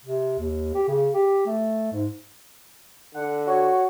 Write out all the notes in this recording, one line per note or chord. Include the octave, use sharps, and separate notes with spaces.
C3
D#2
G4
C#3
G4
A3
G#2
D3 F#5
F#4 C#5